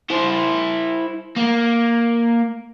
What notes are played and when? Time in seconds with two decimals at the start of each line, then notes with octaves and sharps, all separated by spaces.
0.10 E4 C5
1.36 A#3